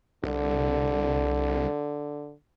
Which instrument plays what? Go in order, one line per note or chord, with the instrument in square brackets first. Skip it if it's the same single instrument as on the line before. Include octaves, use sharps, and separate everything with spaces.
[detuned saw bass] C2 [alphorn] D3